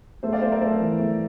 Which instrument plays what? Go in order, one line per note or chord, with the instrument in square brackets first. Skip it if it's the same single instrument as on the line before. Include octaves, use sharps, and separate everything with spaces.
[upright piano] A3 [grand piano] A4 C5
[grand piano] D5 F5
[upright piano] A3 [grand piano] C5 E5
[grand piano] A#4 D5
[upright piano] A3 [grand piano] A4 C5
[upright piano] E3
A3